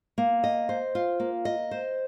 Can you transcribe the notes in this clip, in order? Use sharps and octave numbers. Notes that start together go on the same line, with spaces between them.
A#3
D#5
C5
F4
A#3
D#5
C5